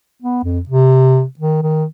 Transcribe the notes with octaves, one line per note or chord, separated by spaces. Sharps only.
B3
F2
C3
D#3
D#3